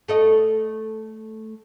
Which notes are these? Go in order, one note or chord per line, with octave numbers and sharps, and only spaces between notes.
A3 A4 D#5